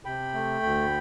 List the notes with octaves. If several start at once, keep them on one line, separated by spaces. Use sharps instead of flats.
C3 G5 B5
A3
D2